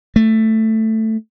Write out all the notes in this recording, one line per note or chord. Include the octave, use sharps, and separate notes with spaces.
A3